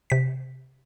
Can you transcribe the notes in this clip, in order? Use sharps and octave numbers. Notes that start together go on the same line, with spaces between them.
C3 B6